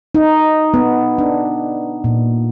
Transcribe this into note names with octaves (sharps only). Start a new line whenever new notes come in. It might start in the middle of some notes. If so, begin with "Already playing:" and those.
D#4
B3
D4
A#2